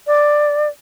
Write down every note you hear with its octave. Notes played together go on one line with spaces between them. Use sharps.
D5